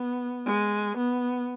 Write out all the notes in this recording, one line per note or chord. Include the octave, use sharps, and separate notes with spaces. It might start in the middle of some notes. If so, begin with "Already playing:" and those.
Already playing: B3
G#3
B3